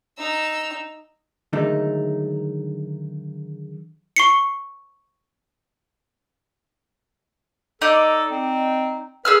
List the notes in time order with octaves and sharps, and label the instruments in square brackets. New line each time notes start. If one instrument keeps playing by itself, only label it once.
[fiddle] D#4 E6
[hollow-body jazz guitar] D3 D#3 F#3 G#3 A3 D#4
[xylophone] C#6 C7 C#7
[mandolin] D#4 D5 [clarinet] A4
[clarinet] C4
[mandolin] G#4 E6 F6 [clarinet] B4